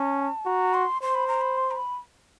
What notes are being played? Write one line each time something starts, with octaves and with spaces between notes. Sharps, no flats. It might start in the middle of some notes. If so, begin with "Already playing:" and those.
Already playing: C#4 A5
F#4 A#5
C6
C5 C6
B5
A#5
B5
C6
A#5
B5